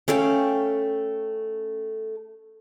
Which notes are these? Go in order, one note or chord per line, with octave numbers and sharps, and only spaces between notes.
A3 C#4 A4 F5 G5